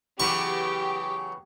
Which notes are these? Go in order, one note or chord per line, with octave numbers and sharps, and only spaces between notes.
C#3 E3 F#3 B3 G4 C#6